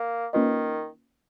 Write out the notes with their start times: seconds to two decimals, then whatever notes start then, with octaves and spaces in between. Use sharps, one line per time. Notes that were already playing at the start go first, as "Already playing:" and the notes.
Already playing: A#3
0.33 D#3 A#3 C#4 F4 B4 D#5